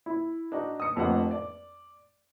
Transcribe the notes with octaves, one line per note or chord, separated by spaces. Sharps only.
E4
D4 D#4 F#4
D#6 C#7
F1 F2 A3 D4 G4 F#5
D5